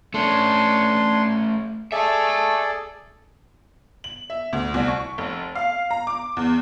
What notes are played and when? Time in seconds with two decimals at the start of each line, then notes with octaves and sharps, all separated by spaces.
0.14 A3 C#4 D4 C6
1.92 G#4 A4 D5 E5 A5
4.04 F#7
4.30 E5
4.53 D2
4.74 C2
4.88 C#6
5.18 F1
5.55 F5
5.91 A#5
6.07 D6
6.37 E2